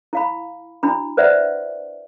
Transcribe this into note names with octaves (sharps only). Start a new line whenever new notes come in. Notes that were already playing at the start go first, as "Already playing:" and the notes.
E4 F5 B5
D4 E4 F#4 B5
B4 C5 D5 E5 F#5